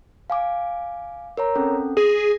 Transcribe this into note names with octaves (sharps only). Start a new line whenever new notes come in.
F5 G#5 D6
A#4 C#5 A#5
C4 C#4 A4
G#4 A#6